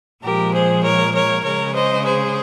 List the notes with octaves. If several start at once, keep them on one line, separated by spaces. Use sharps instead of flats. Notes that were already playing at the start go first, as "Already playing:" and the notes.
A#2 F3 G#3 G4 A#4
G#4 C5
A#4 C#5
A#4 C#5
C#3 G#3 A#4 C#5
C5 D#5
G#4 C5